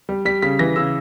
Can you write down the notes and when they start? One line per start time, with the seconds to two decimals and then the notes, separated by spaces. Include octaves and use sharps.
0.09 G3
0.25 G3 B6
0.42 C#3 B6
0.59 E3 A#6
0.76 C#3 E6